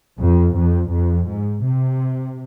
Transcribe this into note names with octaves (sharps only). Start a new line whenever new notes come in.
F2
F2
F2
G#2
C3